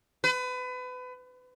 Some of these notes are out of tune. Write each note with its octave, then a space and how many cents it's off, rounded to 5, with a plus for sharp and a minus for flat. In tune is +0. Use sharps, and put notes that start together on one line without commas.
B4 +30